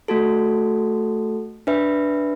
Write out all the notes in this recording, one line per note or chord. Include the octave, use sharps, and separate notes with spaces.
A3 F#4 A4
D4 B4 E5